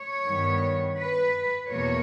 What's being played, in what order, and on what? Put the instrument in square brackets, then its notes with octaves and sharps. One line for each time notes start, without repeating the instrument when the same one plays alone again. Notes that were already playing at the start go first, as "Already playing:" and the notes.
Already playing: [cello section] C#5
G2 D#3 G3 B3
B4
E2 B2 A#3 C#5